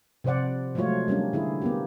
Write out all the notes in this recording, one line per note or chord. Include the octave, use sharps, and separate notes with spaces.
C3 F3 C5 D5 F#5
F3 F#3 G#3 A3 F4 C#5
G3 A#3 C#4 D4
D3 E4 G#4
A#3 B3 G4